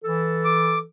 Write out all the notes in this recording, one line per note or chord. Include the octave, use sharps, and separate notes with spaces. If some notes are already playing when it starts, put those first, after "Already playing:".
E3 A4
D6